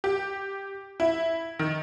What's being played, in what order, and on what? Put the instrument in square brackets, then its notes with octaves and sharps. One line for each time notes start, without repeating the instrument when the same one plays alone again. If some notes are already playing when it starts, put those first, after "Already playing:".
[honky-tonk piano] G4
E4
D#3